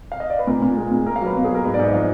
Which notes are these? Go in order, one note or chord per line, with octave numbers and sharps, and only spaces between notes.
F5
D#5
D5
B4
A#2 A#4
A#2
G#3
A#2
A#3 A#4
F5
F#3 B4
B2
G#4
F#3 A#4
G#2 B4
D5
G#2
D#5
F3 F5